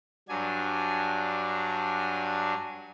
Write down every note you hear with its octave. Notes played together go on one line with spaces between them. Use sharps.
G2 F#3 D4 G#5